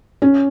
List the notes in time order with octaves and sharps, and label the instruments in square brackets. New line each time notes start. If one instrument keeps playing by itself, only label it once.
[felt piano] C#4